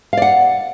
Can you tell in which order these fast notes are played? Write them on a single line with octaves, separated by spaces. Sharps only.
F5 D5 F#5